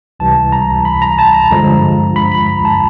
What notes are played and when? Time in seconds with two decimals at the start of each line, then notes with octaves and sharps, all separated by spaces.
0.20 C#2 C3 E3 G3 A5
0.52 A#5
0.85 B5
1.02 A#5
1.18 A5
1.34 A#5
1.51 G2 D3 F3 G#3
2.16 B5
2.32 B5
2.48 A#5
2.65 A5